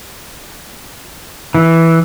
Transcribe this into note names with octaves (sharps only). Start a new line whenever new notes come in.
E3